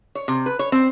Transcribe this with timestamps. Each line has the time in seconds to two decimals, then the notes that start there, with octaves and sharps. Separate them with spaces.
0.15 C#5
0.28 C3
0.46 B4
0.59 C#5
0.72 C4